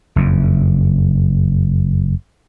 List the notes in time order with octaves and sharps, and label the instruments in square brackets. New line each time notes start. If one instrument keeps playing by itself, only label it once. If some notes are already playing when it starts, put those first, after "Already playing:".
[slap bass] F#1 F2